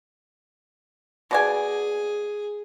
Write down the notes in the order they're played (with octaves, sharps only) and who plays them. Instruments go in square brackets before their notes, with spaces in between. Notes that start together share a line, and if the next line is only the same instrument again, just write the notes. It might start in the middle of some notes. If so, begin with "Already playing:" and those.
[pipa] B2 D5 G#5 [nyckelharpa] G#4